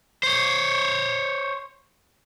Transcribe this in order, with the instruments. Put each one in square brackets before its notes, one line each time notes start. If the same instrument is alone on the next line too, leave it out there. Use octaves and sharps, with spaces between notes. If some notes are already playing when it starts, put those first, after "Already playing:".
[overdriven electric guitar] C5 C#5